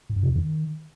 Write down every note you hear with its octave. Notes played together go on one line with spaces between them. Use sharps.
A2
F#2
C3
F2
D#3